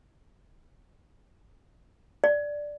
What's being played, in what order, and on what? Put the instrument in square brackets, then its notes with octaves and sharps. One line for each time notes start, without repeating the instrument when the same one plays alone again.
[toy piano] D5